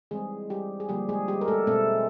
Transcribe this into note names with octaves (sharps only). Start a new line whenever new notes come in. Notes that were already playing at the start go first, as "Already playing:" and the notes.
E3 G3 G#3 C4 G#4
G3 G4
G#4
D3 F3 G3 A#3 G4
G#3 G#4
G3 G4
A#4
A3 A4
B2 G#3 A3 C4 A4